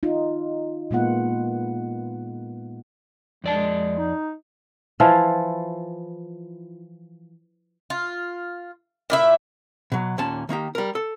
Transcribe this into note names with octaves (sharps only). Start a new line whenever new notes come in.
D#4 F4
A#2 G#3 A#3 B3 F4 F#5
F2 G#3 D5 A5
D#4
E3 F3 E4 F4
F4
A#2 E4 E5
B2 F#3
D#2 A#2 C#4 A5
D#3 A#3 D#4 G4
G3 A#4
A4